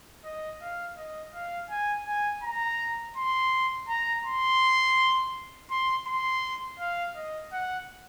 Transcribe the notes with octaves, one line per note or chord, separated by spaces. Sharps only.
D#5
F5
D#5
F5
G#5
G#5
A#5
C6
A#5
C6
C6
C6
F5
D#5
F#5